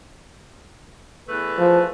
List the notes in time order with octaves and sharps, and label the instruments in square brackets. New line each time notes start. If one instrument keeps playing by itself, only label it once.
[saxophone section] E2 A3 B4
[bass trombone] F3